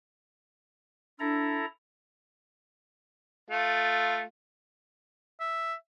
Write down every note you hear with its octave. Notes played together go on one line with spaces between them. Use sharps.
D4 E4 A4 A#5
A3 F4
E5